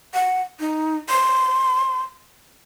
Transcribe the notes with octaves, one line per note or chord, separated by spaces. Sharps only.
F#5
D#4
C6